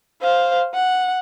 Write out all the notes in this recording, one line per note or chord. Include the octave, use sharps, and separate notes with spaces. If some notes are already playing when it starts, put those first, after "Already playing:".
C5 F5
F#5